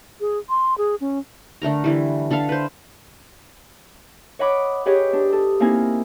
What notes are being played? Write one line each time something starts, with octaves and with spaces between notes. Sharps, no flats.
G#4
C6
G#4
C#4
D3 A3 A#4 A#5
D3 E3 G3
D3 A4 E5 F5
B4 C5
C#5 D#5 F#5 B5 D6
G4 G#4 B4 C#5 D#5
D4
A4 D#6
A#3 C4 D#4 E4 A#4 G#5